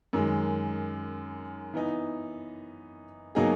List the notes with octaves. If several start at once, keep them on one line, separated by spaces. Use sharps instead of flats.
F#2 D#3 G#3
E3 B3 D#4
B2 F#3 A#3 D#4 G#4